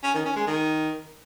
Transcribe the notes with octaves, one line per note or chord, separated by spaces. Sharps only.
C#4
D#3
C#4
G#3
D#3